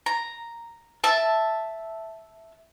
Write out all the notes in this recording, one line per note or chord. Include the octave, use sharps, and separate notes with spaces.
A#5
E5 A5